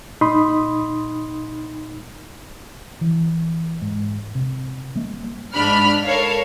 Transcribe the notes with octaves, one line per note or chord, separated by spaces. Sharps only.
A#2 D#4 B5 C6 D#6
E3
G#2
C3
G3 A#3
G#2 D4 B5 F6
A4 A#4 C#5 F5